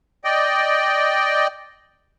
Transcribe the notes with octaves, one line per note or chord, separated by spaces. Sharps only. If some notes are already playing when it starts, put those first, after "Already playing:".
D5 D#5 G5